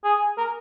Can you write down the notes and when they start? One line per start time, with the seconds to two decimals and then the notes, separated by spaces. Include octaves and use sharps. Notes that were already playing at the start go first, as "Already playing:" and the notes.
0.04 G#4
0.38 A#4